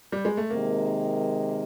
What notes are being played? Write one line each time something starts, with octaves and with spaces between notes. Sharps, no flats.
G3
G#3
A3
C3 D#3 G#3 A#3